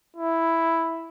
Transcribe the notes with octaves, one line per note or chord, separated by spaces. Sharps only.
E4